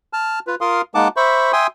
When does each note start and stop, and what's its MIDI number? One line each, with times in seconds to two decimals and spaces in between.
0.13 0.39 81
0.13 0.39 89
0.47 0.55 65
0.47 0.55 71
0.61 0.82 65
0.61 0.82 70
0.61 0.82 77
0.61 0.82 84
0.61 0.82 87
0.95 1.08 56
0.95 1.08 58
0.95 1.08 63
0.95 1.08 78
0.95 1.08 81
0.95 1.08 86
1.17 1.52 72
1.17 1.52 76
1.17 1.52 83
1.17 1.52 85
1.53 1.67 76
1.53 1.67 79
1.53 1.67 80
1.53 1.67 84
1.53 1.67 87